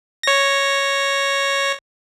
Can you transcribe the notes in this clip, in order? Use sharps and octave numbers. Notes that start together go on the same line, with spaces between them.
C#5 A#6